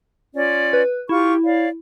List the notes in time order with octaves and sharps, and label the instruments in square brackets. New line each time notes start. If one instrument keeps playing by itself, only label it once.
[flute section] C#4 F4 D5
[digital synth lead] B4
[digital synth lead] E4 [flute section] F4 G4 C#6
[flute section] C#5 D5 F5